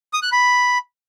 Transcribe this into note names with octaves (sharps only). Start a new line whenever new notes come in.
D#6
F#6
B5